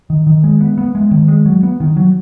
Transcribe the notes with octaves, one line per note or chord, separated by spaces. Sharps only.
D#3
D#3
G#3
B3
B3
G#3
D#3
G#3
F#3
B3
D#3
F#3